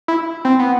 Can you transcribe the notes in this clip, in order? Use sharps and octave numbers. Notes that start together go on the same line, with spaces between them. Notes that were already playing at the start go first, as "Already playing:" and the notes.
E4
C4
B3